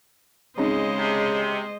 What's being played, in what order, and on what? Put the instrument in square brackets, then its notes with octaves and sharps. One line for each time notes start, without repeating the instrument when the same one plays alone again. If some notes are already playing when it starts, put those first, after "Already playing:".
[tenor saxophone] C#3 [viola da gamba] G#3 C5 D#5 [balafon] C4 C#4 D#4
[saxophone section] C3